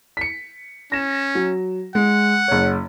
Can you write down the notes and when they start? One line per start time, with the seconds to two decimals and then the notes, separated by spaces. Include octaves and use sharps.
0.17 B6 C#7
0.92 C#4 A#6 E7
1.35 F#3
1.95 G#3 F#5
2.48 F#1 C#5